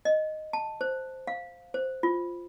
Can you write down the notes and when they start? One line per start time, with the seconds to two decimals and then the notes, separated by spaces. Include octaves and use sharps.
0.05 D#5
0.53 A5
0.81 C5
1.27 F5
1.74 C5
2.03 F4